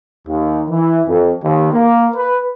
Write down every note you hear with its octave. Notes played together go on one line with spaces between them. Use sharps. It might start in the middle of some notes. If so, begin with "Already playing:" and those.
D#2
E3
F2
D#2
A#3
B4